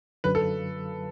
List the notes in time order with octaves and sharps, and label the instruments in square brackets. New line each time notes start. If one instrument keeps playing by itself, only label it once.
[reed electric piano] F#2 D3 F#3 [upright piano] B4
[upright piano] A4